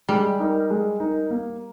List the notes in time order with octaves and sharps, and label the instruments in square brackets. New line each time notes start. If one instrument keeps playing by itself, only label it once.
[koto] G3 [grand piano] G#3
[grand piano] D#4 A#4
G#3
D#4 A#4
A#3